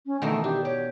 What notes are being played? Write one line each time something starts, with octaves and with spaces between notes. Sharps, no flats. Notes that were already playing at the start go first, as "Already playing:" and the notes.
C#4
B2 D#3 E3 A3
D4 G4
G4 C#5